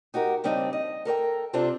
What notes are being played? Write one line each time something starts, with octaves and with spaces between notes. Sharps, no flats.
D#4 F#4 G4 A#4
C#3 G3 C4 D4 D#4
D#5
A4 A#4 C#5 G5
C3 C4 D4 F4 G4 A4